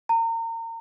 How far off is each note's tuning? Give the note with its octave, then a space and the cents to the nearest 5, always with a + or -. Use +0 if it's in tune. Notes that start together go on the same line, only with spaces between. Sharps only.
A#5 -30